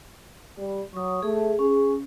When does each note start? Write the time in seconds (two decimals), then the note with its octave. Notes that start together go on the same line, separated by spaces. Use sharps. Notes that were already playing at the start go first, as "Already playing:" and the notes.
0.57 G3
0.93 F#3 C#6 D#6
1.23 A3 G#4
1.59 C#4 G#4